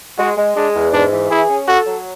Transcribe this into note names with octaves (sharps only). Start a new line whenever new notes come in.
G#3 F#4
G#3
G#3 D4
E2
G#2 D4
E3
E4 G#4
C#4
F#4 A4
F#3